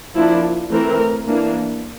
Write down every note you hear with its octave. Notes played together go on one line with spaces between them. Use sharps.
F3 A#3 D4 E4
E3 A3 C4 A#4
E3 A#3 D4